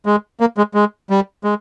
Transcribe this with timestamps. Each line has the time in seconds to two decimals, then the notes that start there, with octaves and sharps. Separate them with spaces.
0.06 G#3
0.40 A#3
0.57 G#3
0.74 G#3
1.10 G3
1.44 G#3